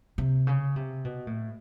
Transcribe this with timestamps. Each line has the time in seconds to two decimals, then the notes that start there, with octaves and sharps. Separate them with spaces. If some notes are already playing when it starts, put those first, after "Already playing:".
0.18 C3
0.47 C#3
0.76 C3
1.05 B2
1.27 A2